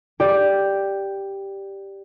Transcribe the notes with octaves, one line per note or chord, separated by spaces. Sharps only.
G4 D5